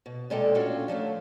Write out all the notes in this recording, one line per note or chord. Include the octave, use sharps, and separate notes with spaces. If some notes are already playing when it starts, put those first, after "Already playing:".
B2
A#2 G#3 A4 D5 G5
A3 C#4 D4 F4 F#4
F3 F#3 A3 A4